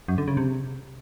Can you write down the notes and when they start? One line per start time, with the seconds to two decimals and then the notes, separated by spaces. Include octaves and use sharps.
0.08 F#2
0.18 D3
0.28 C#3
0.37 C3